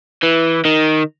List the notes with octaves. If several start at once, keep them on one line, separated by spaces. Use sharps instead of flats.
E3
D#3